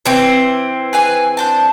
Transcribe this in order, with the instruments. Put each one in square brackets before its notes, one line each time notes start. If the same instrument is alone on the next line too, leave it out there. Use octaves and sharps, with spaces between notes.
[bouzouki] E3 C4
[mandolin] G#4 B4 G#5
D4 C5 A5